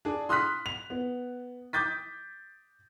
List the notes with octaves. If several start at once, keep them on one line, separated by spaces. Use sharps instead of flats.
D4 G#4
C6 D#6 F6 F#6 B6
F7
B3
D6 D#6 G6 A6 B6